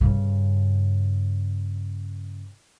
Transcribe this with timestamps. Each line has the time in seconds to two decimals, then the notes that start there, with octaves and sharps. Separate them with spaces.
0.01 G2 C#3